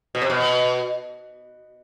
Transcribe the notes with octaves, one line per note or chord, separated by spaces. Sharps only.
B2
C3
B2